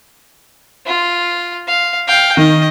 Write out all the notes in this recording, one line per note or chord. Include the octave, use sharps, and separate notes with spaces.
F4
F5
F5 G5
D#3 D#5